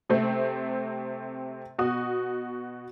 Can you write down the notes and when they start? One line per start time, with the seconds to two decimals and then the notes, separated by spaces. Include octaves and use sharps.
0.09 C3 A3 C4
1.79 B2 F#4 D#6